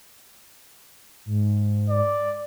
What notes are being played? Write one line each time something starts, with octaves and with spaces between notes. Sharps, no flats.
G#2
D5